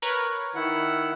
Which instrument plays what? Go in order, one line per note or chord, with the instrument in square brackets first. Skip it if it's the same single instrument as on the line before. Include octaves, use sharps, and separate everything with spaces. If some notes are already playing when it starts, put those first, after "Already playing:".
[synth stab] A#4 B4 C#5
[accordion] D#3 E4 F#5